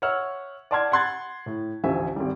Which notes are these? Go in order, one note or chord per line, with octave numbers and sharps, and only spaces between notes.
C#5 E5 F#5 E6 F6
D5 F#5 A5 C6 F6 G#6
F#5 B5 C6 F#6 G#6 A6
A2
A1 D2 F3 E5 G#5
G#1 G3